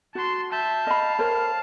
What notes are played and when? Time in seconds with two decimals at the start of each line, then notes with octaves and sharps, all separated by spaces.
0.15 F#4 A5 C6
0.52 E5 A5 G6
0.87 D#5 F5 B5
1.19 A#4 C5 C#5